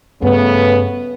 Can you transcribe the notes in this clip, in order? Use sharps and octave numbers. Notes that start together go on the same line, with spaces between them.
G2 C#3 A3 B3